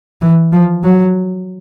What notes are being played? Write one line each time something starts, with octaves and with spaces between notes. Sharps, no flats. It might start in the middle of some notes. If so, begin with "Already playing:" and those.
E3
F3
F#3